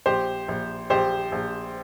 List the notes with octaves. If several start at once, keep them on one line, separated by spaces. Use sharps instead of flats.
A#1 G4 C5
A#1
A#1 G4 C5
A#1